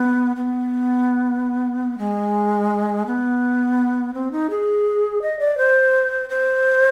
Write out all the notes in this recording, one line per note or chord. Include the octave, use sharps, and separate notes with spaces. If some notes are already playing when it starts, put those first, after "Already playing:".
Already playing: B3
B3
G#3
B3
C4
D#4
G#4
D#5
D5
C5
C5